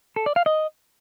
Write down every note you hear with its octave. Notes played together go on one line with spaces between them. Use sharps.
A4
D5
F5
D#5